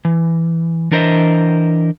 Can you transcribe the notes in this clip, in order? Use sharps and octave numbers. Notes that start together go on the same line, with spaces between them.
E3
E3 D4 A#4 C5 D#5 E5